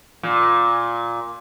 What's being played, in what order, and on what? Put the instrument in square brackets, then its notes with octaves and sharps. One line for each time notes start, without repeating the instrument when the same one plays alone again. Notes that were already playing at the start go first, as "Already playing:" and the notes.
[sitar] A#2